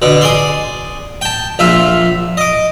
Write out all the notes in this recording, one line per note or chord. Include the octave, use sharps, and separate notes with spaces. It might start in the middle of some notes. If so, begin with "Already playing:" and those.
B2 D3
G#4 D5 C6
G5 A5
A#1 F4 E5
D#5 D6